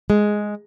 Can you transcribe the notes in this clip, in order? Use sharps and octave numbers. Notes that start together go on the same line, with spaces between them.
G#3